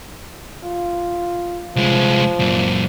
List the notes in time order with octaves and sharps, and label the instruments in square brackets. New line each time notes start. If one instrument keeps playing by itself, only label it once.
[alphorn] F4
[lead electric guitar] C2 G#3 [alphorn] F3
[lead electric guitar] F#2 A#2